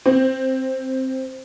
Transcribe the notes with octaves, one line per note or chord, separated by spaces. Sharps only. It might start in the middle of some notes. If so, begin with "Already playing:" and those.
C4